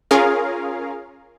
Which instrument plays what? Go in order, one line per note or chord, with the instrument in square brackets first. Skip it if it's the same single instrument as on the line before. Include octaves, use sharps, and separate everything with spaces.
[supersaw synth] C#4 F4 G#4 A#4 F5